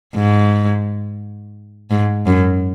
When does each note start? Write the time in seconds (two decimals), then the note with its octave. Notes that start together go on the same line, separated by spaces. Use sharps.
0.15 G#2
1.91 G#2
2.27 F#2